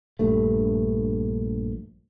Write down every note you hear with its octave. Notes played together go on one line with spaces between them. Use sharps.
A#1 G2 A3